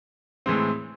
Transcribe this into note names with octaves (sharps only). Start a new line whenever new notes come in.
A2 E3 G#3 C4